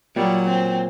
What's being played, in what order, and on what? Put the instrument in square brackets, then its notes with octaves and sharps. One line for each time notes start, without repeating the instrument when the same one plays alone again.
[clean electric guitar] A#2 [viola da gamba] F#3 [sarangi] G3
[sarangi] C4